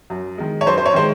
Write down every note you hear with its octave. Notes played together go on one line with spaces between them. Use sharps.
F#2
D#3 G#3
C#5
F#2 C5
C5
C#5
D#3 G#3 C5